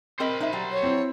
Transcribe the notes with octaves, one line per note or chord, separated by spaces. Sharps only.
C4 A#4 C5 D#5 B5
D#4 E5
F#3 G3 A#5
C#5
C4 E4